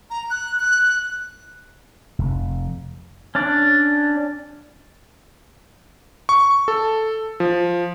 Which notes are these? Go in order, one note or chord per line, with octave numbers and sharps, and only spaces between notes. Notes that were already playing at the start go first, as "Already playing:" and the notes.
A#5
F#6
F#6
F1
C#4 D4 D5
C#6
A4
F3